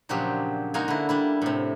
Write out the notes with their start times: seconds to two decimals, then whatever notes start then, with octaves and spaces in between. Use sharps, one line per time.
0.09 A#2 C#3 F3 F#3 D4 G4
0.74 G#3 A#3 D#4 F#4 F5 G#5
0.88 D3 E4
1.09 G3 D4 E4
1.42 A2 C3